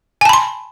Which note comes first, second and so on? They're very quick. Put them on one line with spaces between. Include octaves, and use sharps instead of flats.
G#5 A5 B5 C6